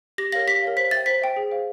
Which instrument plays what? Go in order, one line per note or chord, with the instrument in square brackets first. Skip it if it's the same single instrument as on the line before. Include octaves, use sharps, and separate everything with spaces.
[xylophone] G4 A#6
A#4 C#5 F5 A#6
G4 B6
A#4 C#5 F5
C5 B6
E5 G5 A6
C5 B6
E5 G5
G#4
C5 F5